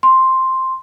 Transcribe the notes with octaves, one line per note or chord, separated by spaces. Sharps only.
C6